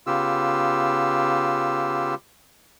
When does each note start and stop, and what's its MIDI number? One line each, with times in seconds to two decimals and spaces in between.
0.07 2.15 49
0.07 2.15 59
0.07 2.15 65
0.07 2.15 67
0.07 2.15 88